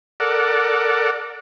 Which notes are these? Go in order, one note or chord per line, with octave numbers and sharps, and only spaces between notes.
A4 A#4 D5 F#5